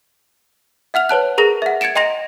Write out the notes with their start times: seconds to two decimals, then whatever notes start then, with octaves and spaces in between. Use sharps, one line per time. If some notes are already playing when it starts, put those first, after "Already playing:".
0.94 E5 F#5 F6 F7
1.09 B4 C#5 A5 F#6
1.38 G#4 A#4 A#5 A#6
1.62 E5 F#5
1.81 G#6 A6 C#7 D7 E7
1.95 D#5 G5 A#5 C6 A#6 F7